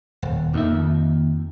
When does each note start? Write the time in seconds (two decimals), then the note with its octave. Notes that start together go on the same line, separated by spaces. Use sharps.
0.22 D#1
0.53 F2 A#3 D#4 E5
0.71 D#2